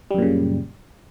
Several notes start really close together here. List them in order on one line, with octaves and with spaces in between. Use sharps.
G3 F#2 A#2 C#3